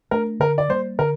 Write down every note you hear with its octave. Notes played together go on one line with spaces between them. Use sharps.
A3 D4 A#4
D3 A#4
D5
G3 A#3 C5
D3 A#4